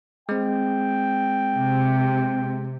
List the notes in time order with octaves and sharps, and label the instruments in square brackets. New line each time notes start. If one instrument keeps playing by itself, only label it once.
[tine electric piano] G#3 C4 [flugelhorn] G5
[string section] C3